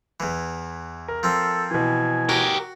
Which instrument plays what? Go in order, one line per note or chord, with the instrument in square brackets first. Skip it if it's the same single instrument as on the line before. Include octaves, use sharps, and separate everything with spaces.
[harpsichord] E2 E3
[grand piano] A#4
[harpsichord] F3 C4 [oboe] A4
[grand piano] B2 E3 [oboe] G#5
[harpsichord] F#4 [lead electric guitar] G4 A#4